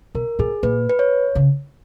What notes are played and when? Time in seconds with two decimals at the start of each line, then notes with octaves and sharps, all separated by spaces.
0.15 B2 A#4
0.39 A#2 G#4
0.63 A#2 B4
0.89 B4
0.99 C#5
1.35 C#3